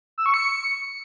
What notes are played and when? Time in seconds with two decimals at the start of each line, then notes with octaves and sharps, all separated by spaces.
0.18 E6
0.26 C#6
0.34 C#7